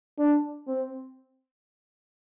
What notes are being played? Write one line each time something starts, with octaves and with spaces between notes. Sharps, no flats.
D4
C4